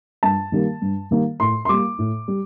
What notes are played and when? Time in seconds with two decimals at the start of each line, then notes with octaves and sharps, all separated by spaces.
0.23 G2 A5
0.52 D#3 G3 A#3
0.81 G2
1.11 D#3 G3 A#3
1.40 A2 C6
1.65 C6
1.69 G3 A#3 D6
1.99 A2
2.28 G3